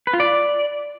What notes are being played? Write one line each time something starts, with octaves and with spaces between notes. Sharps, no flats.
B4
F4
D5